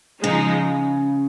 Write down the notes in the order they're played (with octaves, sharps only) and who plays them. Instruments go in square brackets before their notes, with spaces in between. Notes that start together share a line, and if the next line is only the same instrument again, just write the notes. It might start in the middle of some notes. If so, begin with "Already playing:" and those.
[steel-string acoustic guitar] C#3 [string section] F3 G#3 D#4